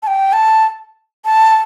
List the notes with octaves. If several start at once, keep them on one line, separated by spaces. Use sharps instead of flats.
A5
G5
A5
A5